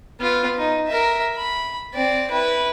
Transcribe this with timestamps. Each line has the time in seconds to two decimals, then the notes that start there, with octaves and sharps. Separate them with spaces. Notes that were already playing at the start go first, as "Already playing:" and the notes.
0.20 B3 F4
0.58 D#4
0.88 A#4 E5
1.36 B5
1.94 C4 D5
2.31 E4 B4